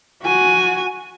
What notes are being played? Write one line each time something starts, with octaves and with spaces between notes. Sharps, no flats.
F#4 G#5